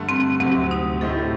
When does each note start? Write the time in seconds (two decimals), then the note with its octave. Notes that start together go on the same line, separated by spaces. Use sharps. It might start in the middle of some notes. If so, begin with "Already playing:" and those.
Already playing: G2 D3 A3
0.09 C4
0.40 D2 C3 F#3 C4
0.71 D#4
1.01 A2 A3 D#4 G4 A4 C5